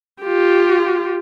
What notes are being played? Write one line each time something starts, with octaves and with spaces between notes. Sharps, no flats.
F4 G4